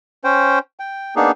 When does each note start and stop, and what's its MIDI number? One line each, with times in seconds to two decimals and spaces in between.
0.24 0.59 61
0.24 0.59 72
0.24 0.59 79
0.80 1.15 79
1.16 1.31 58
1.16 1.31 59
1.16 1.31 62
1.16 1.31 63
1.16 1.31 68